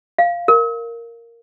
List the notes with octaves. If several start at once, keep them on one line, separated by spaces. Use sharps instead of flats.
F5
A#4